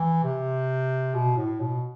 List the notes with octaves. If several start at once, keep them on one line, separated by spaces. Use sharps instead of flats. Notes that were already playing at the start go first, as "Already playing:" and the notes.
Already playing: E3
C3
B2
A2
B2